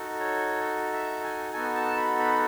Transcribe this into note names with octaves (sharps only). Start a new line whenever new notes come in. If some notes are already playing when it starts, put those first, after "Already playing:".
Already playing: D#4 F#4 A4
C#5
E5
G#5
B3 D#4 F#4 A4 G#5
A5
B5
B5